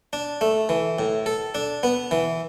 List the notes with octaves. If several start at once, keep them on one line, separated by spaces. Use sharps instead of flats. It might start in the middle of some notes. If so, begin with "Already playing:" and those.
D4
A3
E3
A2
A4
D4
B3
E3